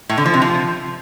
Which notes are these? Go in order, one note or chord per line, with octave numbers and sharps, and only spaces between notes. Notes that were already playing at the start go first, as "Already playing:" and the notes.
A2
D3
F3
C3
F3